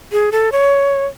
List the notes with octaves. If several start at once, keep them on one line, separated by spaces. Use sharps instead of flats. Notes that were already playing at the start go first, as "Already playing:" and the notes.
G#4
A4
C#5